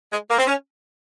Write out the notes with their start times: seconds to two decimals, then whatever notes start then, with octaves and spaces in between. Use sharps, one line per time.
0.11 G#3
0.29 A#3
0.38 C4
0.47 C#4